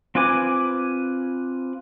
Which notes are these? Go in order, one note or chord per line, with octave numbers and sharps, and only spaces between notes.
C4 F4 B4 G#5 D6